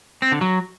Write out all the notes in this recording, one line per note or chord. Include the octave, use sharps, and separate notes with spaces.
C4
D3
F#3